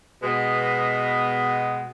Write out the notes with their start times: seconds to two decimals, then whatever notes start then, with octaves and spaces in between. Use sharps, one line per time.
0.21 B2 G#3 B3